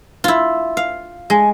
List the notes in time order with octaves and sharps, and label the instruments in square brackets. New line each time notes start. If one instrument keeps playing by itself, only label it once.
[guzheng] E4 F4
F5
[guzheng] G#3 [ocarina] G#5